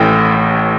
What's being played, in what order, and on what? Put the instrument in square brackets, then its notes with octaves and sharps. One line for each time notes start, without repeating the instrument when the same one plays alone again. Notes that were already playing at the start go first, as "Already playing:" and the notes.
Already playing: [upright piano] A1 A2 E3 G5